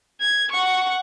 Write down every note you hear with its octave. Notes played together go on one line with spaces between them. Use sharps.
G#6
F#5 C#6